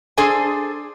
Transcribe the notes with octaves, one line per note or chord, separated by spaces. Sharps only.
D4 G#4 A4 C5 G#5